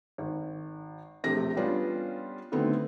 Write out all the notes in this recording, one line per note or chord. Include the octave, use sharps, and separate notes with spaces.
G#1
E1 A#1 A3 C4 G4 A#6
G3 B3 C#4 D4 F4 G4
D3 D#3 F#3 A3 B3 C4